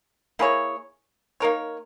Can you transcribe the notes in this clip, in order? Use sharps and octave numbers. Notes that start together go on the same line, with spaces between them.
A#3 E4 G#4 C#5
A#3 D#4 A#4 C#5